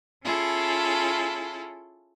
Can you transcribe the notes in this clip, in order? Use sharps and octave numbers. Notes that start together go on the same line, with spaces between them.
C#4 E4 F4 G#4 A4